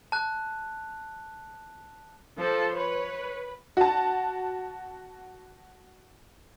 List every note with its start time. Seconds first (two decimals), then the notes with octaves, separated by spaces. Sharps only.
0.12 A5 F#6
2.38 F3 A4 C5
2.75 B4 C#5
3.77 F#4 A5